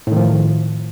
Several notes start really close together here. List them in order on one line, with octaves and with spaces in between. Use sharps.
A2 D#3 F3